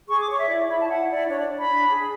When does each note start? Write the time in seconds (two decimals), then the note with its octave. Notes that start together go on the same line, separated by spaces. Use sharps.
0.09 G#4 C#6
0.20 D6
0.29 C#5 C#6
0.39 E5
0.49 E4 D5
0.69 E4 B5
0.79 A5
0.89 E4 F#5
1.09 E4 D5
1.29 D4 C#5
1.39 D5
1.49 D4
1.58 B5
1.69 D4
1.89 G#4